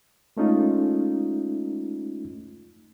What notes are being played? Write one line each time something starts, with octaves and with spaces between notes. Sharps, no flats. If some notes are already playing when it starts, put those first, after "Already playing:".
G#3 A3 C#4 D#4 F4